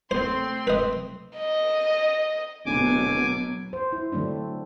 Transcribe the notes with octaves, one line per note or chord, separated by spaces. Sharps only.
A3 C4 C5 C6
B4 D#5
D#5
D1 B2 F#3 G#5 D6
C5
E4
D3 F#3 A3 C4 D4